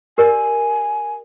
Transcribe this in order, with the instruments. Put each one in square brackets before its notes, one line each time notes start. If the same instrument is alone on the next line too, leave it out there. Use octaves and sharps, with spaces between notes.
[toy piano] G4 A#4 D5 [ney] G#5